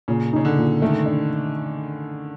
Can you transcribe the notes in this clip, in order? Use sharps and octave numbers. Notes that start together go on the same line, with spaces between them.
A#2 C#3
C#3 D#4
D3
A#2
D#3 A3
D4